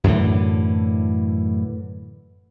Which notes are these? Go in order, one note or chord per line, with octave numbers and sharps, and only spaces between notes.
F#2 A2 D3 E3